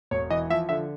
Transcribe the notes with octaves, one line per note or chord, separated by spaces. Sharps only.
E1 C#5
E3 D#5
F3 E5
D3 E5